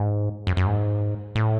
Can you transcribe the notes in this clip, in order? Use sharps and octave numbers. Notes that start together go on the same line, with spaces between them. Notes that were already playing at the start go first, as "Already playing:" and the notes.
Already playing: G#2
F#2
F#2
G#2
A2